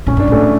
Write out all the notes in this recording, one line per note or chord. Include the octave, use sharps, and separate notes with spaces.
A2 C#4
G2 D4
A2 A3 C#4